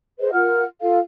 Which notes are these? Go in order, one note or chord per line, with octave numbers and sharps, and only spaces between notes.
G#4 B4 C5 D#5
F4 A#4 F#5 F6
F4 A4 F5